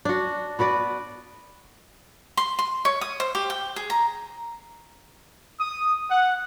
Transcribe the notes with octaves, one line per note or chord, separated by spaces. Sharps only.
D4 F#4
B3 F#4 B4 D5
C6
C6
C#5
D#6
C5
G4
G5
G#4
A#5
D#6
F#5